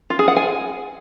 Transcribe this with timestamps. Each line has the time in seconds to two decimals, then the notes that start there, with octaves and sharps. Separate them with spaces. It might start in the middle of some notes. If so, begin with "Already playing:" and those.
0.10 F4
0.19 G#4
0.28 F#5
0.36 G#5